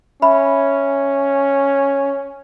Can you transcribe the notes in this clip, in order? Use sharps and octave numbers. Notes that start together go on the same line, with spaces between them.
C#4 E5 B5